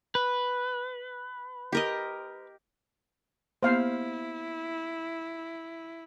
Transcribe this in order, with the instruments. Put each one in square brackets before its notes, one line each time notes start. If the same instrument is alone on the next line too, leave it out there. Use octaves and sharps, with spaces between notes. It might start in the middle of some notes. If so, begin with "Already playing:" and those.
[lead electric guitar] B4
[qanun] G4 A#4 D#5
[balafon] A#3 B3 G4 [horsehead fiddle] E4 [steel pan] C5 F5